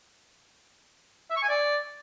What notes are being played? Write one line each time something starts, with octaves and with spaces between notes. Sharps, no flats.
E5
C#6
G#5
D5